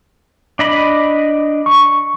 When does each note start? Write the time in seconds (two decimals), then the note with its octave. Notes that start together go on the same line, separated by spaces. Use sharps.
0.59 D4 D#5 B5
1.66 C#6